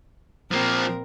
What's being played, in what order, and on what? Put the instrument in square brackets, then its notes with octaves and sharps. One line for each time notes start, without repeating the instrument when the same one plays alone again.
[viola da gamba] A#2 C4 A#4 [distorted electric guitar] F3 A#3